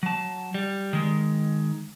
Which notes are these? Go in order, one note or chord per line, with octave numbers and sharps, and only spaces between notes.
F#3 A5
G3
D#3 G#3